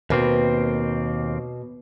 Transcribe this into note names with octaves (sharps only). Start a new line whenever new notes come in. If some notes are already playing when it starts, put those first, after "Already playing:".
D#2 B2 A#3 C4